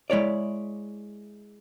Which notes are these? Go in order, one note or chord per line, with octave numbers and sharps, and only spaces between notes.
G#3 E4 C#5 D5